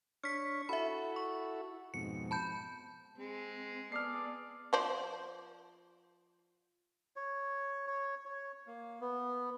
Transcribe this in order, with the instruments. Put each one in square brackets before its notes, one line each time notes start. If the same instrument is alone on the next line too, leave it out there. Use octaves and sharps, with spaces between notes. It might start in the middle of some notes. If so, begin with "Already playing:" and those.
[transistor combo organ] D4 C#5 C#6 [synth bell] F6 B6
[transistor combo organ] E4 F#4 A4 [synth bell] E5 B5
[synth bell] C#6
[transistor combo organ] F2 G#2 B2 [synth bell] C#7
[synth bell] A5 B5 G6
[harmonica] G#3 [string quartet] C4
[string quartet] B3 [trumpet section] G#4 A4 D5 [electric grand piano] F6 C7
[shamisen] F3 C5 D5
[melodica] C#5
C#5
C#5
A#3
B3